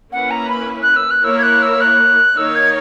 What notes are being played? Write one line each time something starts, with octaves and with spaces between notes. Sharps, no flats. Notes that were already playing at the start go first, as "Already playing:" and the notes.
A#3 C#4 E4 B4 F#5
A#5
B5
F#6
E6
F#6
A#3 E4 A#4 C#5 E6
G#6
F#6
E6
F#6
D#3 A#3 D#4 A#4 C#5 E6
G#6